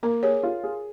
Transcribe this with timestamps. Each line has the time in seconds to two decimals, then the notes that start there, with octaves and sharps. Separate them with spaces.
0.03 A#3 A#4
0.23 G#4 C#5
0.43 F4
0.64 G#4